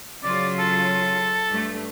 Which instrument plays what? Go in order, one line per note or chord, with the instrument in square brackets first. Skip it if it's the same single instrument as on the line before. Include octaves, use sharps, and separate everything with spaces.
[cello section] C#3 F#3 F4 [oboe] D5
[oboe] A4
[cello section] G2 A3